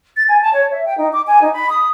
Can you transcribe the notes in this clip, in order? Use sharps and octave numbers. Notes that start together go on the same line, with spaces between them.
A6
G#5
A5
C#5
E5
G5
D#4
D6
G#5
D#4
B5
D#6